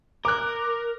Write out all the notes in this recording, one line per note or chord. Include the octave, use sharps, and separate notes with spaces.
A#4 D6 F#6